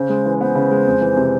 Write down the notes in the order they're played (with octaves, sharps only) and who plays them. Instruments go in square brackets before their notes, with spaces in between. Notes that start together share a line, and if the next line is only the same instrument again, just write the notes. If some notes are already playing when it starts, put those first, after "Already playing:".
Already playing: [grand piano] C#3 [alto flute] C5
[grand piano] G#3
E3
[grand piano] B3 [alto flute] C5
[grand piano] C#3
G#3
F2
E3
C3